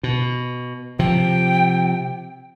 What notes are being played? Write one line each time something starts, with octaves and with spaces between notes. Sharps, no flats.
B2
C3 F3 G5